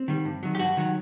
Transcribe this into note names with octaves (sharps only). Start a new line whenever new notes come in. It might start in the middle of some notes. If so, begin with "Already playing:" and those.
Already playing: C4
D#3 G3
G2
D#3 F#3
G4
G2 F#4
D#3 F#3